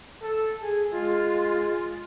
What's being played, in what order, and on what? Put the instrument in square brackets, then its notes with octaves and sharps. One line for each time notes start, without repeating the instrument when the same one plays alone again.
[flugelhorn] A4
G#4
[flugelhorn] G#3 [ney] F4